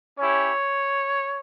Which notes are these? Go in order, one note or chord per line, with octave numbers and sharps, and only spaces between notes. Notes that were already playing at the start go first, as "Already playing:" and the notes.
C#4 E4 G4 C#5